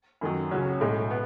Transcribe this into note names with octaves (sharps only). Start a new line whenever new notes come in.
F#2 D#3 F#3
C#2 C#3 F#3 C#4 F#4
B1 A2 G#3
B3